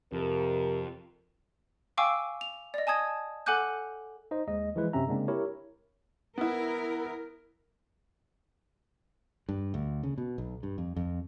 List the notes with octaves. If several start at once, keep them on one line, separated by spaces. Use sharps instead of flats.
F2 C3 A#4
F5 G5 G#5 C#6 D6 E6
F7
D5 D#5
G#5 A5 D#6 G#6
A4 F#5 G#5 D6 F#6 G6
D#4 C5 D#5
D#2 G#3 D#5
E3 F3 G#3 E4 B4
F#2 C3 C4 C#4 E5 A#5
C#3 G#3 A#3 C4 D4
E4 G4 A#4 C#5
B3 E4 A#4
G2
D2
C#3
B2
B1
G2
F2
F2